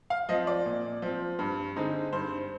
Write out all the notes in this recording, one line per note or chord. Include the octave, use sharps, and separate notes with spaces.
F5
F3 C4 D#5
D5
A#2
F3 C4
G2
D3 G#3 C4 D#4
G2 C5